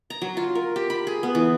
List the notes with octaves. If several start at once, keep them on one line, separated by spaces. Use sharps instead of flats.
A#5
F#3
F4
A#4
G4
B5
G#4
B3
E3